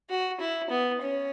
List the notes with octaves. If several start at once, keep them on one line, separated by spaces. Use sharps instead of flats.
F#4
E4
B3
C#4